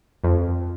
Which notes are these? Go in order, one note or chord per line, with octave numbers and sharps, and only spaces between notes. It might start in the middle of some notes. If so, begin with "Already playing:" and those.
F2